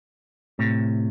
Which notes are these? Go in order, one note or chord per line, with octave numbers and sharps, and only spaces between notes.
A2 C3